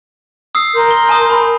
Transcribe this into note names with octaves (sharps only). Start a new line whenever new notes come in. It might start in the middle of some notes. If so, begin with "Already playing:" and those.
D#6 E6 C7
A#4 C6 G6
G7
G#5 A5 D#6
B5